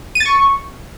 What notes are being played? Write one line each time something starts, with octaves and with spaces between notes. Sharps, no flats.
D#7
A6
C#6